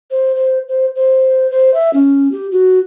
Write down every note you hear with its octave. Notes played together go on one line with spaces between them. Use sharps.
C5
C5
C5
C5
C5
E5
C#4
G4
F#4